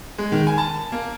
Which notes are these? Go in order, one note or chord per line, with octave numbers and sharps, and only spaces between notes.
G#3
D#3
G#5
A5
A#3